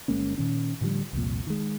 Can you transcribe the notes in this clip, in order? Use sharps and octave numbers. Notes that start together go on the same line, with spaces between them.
G1 G#3 A#3 C#4
A#2 D#3 C#4
A2 D3 F3 G3
C2 F2 A#2
D#3 G#3